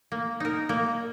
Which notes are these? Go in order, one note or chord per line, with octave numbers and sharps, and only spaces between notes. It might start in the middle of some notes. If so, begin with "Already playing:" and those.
A#3
D#4 A#4
A#3